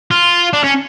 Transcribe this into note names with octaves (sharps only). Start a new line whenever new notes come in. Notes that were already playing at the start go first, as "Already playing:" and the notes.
F4
D4
C#4